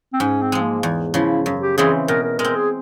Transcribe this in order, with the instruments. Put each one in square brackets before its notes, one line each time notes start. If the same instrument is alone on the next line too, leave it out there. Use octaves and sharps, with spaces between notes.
[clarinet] C4
[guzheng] G#2 [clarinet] C#4
[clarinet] C4
[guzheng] F3 G#3
[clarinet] A#3
[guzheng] E2
[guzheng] C#3 F3 [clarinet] E4
[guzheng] F#2
[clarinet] G4
[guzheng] C#3 E3 G#3 C4 [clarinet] G#4
[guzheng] B2 [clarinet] A#4
[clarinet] A#4
[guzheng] G#3 [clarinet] A#4
[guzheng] C4
[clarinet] G#4